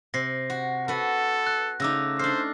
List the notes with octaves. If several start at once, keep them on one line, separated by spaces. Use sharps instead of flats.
C3 A#6 C7
F#4
F#4 A4 B4
F#6
C#3 A3 D#4 D6 E6 A#6
D4 A4 C5 F6 C7